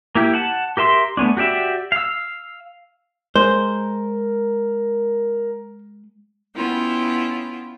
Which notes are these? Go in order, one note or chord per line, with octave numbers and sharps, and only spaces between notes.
A#3 E4 G4
F#5 A5
G4 A#4 E5 C6
A3 B3 C#4 D4
F#4 G4 D5 E5
F5 E6
G#3 A#4 C5
B3 C#4 E4 F4 G5